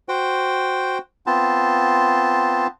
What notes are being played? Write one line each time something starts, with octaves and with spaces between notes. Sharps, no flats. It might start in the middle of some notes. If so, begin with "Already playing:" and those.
F#4 C5 G5
B3 C4 F4 A5